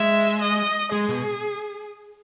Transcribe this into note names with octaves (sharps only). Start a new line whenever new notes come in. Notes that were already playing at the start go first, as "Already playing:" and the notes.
Already playing: G#3 E5
D#5
G#3 G#4
B2